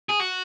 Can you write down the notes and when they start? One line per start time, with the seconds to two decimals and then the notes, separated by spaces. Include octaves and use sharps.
0.09 G#4
0.20 F#4